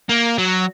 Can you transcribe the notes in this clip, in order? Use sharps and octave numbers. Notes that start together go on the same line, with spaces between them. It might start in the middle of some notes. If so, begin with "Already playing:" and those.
A#3
F#3